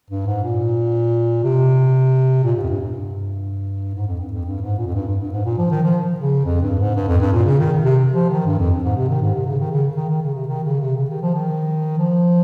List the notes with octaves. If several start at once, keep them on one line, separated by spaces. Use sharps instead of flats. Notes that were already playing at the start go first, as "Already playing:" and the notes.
G2
G#2
A#2
C3
A#2
G#2
F2
G2
G2
G#2
F2
G2
F2
G2
G#2
A#2
F2
G2
G2
G2
G#2
A#2
F3
D#3
F3
C#3
F2
G2
G#2
G2
F2
G2
A#2
C#3
D#3
C3
F3
D#3
G2
F2
G#2
C3
D#3
G#2
C3
C#3
D#3
C#3
D#3
D#3
C#3
C3
D#3
C#3
C3
C#3
D#3
F3
D#3
F3